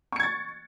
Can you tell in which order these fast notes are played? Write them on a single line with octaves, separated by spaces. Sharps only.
C#6 C#7 G#6 A6